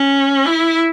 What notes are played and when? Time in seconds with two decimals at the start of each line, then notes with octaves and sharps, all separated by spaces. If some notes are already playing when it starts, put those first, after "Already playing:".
Already playing: C#4
0.46 E4